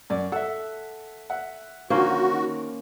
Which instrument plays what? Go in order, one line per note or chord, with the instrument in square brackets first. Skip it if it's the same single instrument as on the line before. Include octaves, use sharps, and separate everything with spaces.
[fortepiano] F#2 D5
[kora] A4 [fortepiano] E5 F#5
[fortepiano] E5 F#5
[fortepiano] D3 D#3 F3 [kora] A#3 C#4 C5 [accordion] F#4
[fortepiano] D#3